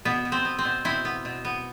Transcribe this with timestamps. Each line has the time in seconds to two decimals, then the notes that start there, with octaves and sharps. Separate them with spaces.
0.05 B2 B3
0.25 B2
0.32 C4
0.45 B3
0.59 C4
0.65 B2
0.85 B2 C4 E4
1.05 B3
1.25 B2
1.45 B3